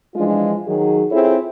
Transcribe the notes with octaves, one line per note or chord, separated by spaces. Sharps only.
E3 F3 G#3 D4 F4
D#3 F#3 G#4
C4 E4 F4 G#4 A4 C#5